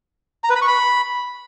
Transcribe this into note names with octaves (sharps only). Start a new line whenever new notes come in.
A#5
B4
B5
C#6
B5